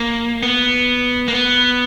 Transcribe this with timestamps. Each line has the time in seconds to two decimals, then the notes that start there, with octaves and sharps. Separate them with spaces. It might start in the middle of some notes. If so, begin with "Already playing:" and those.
Already playing: A#3
0.43 B3
1.28 A#3
1.33 B3